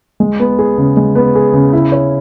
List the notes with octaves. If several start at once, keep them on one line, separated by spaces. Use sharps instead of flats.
G#3
B3
G#4
C#3
G#3
B3
G#4
C#3
E4
C#5